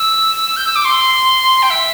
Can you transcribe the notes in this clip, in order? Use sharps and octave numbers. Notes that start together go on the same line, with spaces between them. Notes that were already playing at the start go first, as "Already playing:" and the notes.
Already playing: E6
G6
E6
D6
C6
G5
E5